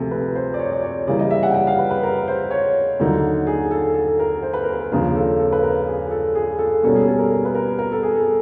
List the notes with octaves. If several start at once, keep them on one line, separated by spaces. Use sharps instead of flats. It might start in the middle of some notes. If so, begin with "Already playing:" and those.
Already playing: D2 C3 F3 A#3 G#4 A4
B4
C5
D5
C#5
D5
C#5
C#3 E3 G3 A#3 D5
D#5
E5
F#5
G5
F#5
F5
B4
B4
A#4
C5
C#5
D#2 D3 F#3 A#3 D#4
G#4
A4
A4
A#4
C5
B4
A#4
B4
D#2 C#3 F3 A#3 D4 A#4
A4
A4
B4
A#4
G#4
A4
G#4
A4
B2 G3 A#3 C#4 A4
G#4
A4
A#4
A#4
B4
A#4
A#4
A4
G#4
A4